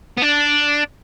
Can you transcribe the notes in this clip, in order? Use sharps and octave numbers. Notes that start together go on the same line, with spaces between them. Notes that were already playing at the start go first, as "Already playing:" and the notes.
B3
D4